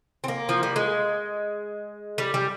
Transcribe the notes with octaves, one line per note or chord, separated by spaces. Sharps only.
C4
A#3
F3
G3
G#3
G3
G3